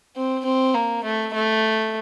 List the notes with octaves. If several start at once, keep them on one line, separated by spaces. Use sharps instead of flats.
C4
C4
A#3
A3
A3